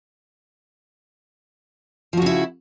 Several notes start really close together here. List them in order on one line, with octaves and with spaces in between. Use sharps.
F3 F#4 C#3 E4